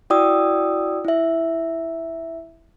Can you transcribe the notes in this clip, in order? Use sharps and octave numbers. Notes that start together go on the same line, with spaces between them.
E4 F#4 D5 G5 D#6 E6
E4 E5